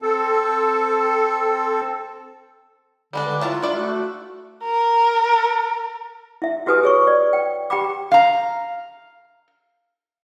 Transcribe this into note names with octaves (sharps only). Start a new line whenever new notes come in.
C4 A4
D3 G3 G#3 D4
D3 B4
F#3 E4 F4 A5 A#5
D4 E4 D5 E5
A3 F#4
A#4
E4 E5
E4 F#4 G4 B4 G#5 D#6
G#4 C#5 C#6
D5
G5
G4 G5 A#5 B5 D6
F5 A#5